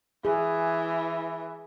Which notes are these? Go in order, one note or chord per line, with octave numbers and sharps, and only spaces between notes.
E3 G#4